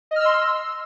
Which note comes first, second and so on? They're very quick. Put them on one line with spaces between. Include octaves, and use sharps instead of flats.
D#5 F6 E6 C6